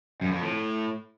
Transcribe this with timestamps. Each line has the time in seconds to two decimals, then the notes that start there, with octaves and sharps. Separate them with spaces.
0.21 F#2
0.32 F2
0.42 A2